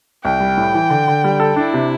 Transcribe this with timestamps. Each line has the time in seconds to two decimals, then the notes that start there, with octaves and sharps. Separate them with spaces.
0.24 C2 G5
0.40 G3
0.58 A2
0.74 E3
0.90 D3
1.08 D3
1.24 G3
1.40 A4
1.56 D4 E4
1.74 C3